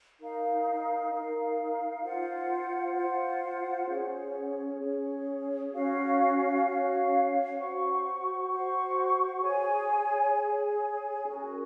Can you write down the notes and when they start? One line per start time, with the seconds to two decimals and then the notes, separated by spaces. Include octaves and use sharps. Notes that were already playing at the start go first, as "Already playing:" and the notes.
0.20 D#4 A#4 F5
1.11 D#4 A#4 F5
2.03 F4 C5 F#5
2.96 F4 C5 F#5
3.89 C#4 G#4 C#5
4.80 C#4 G#4 C#5
5.73 C#4 F#4 C#5 F5
6.65 C#4 F#4 C#5 F5
7.58 F#4 C5 F#5 C#6
8.49 F#4 C5 F#5 C#6
9.42 G#4 C#5 G#5
10.33 G#4 C#5 G#5
11.26 C#4 F#4 A#4